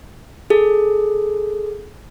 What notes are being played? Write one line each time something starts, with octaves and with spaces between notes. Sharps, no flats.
G#4 A4